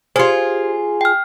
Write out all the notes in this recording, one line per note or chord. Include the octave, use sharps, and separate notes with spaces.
F4 G4 G#4 C5
G5 F6